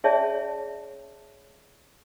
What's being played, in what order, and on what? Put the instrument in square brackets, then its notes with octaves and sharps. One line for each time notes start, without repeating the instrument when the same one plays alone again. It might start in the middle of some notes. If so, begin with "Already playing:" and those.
[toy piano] C#4 G#4 C#5 D5 E5 A5